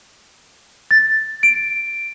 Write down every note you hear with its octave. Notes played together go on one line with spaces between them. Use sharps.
A6
D7